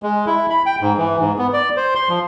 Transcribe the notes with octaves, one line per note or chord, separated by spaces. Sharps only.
G#3
E4
B5
G5
G#2
E3
G#2
B3
D5
C5
C6
F3